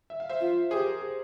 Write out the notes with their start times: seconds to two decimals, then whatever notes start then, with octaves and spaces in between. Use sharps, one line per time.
0.10 E5
0.20 F5
0.29 C5 E5
0.40 F4
0.71 G4 G#4 C5
0.86 G4 A#4
1.02 G#4